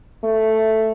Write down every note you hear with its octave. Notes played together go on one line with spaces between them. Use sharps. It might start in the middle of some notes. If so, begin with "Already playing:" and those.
A3